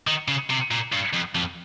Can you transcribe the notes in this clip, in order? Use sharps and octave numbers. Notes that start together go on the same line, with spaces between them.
D#3
C#3
C3
A#2
G2
F2
F2